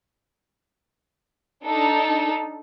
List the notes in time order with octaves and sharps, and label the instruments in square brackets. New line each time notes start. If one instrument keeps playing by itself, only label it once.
[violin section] D4 D#4 A4